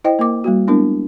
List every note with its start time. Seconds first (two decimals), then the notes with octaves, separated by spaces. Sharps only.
0.04 E4 C5 D#5 G5
0.19 A#3 A#4 D6
0.44 G3 A#3 F#4
0.67 G#3 B3 D4 E4 A#4